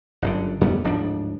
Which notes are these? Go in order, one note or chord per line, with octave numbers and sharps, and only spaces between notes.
G1 F#2 D3
F2 G3 B3
D1 G#2 F3 D4